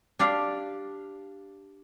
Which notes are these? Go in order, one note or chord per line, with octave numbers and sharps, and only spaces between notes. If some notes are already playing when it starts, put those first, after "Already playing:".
D4 G4 D5 F5